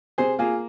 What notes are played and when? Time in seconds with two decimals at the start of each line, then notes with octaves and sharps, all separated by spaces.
0.18 C3 G#4 C5
0.39 A#3 F4 G#4